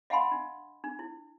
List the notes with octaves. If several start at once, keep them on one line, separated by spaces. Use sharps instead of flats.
D#5 F5 F#5 G#5 B5 C6
D4
D4
E4